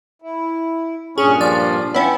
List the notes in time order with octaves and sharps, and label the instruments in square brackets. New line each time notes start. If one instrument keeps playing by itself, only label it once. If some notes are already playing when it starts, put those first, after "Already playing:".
[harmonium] E4
[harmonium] G2 A#2 D4 [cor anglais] C#4 [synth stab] G#4
[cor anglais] F3 [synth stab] D5
[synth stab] B3 C#4 [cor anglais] E4 [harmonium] G5